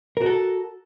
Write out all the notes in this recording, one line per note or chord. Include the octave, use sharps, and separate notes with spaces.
F#4 A4 A#4